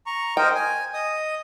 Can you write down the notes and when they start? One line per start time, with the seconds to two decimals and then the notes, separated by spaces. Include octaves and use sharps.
0.06 A#5 C#6
0.37 A#4 C5 D#5 G5
0.55 G#5
0.94 D#5 D#6